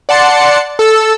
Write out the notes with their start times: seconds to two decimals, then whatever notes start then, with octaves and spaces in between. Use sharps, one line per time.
0.09 D5 F#5 A5 C6 C#7
0.79 A4 E6